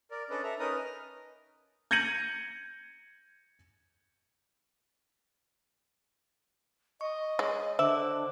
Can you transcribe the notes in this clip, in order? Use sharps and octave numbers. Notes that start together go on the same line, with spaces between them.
A#4 D5
C#4 D4 A4 B4 D5 D#5
A4 E5 A#5
C#4 D#4 A#4 B4 D#5 D#6
F6
G6 G#6 A#6 C#7 D#7 F#7
D#5 C#6
G#3 C#5
D3 C5 E5 D6